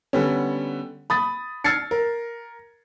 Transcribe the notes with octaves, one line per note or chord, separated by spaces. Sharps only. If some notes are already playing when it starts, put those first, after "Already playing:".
D3 G3 B3 C#4
B5 D#6 A6
E6 F6 G#6 A6 C7 C#7
A#4